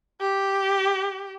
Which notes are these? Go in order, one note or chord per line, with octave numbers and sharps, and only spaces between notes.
G4